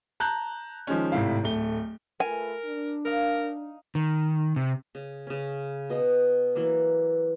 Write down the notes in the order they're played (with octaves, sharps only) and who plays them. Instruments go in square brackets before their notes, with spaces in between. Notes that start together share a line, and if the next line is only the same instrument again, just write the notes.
[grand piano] A5 A#5 F#6 G6
D#3 F3 G#3 C#4
G#1 A2 C3 E4 F5
D1 A3 G7
[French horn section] A3 F4 B4 [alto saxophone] A#4 [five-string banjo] G#5
[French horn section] D4
[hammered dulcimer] D#4 F5 [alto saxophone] A#4
[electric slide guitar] D#3
C3
[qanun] C#3
C#3 C#4
B2 D#5
E3 F#3 A#3